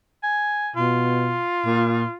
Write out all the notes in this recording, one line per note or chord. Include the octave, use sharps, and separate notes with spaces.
G#5
B2 F4
A#2